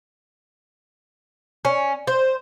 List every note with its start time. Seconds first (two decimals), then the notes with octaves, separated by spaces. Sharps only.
1.65 C#4
2.07 C5